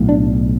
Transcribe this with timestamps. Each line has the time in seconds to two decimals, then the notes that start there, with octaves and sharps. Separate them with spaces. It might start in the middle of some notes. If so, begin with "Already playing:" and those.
Already playing: B1 A2
0.09 D4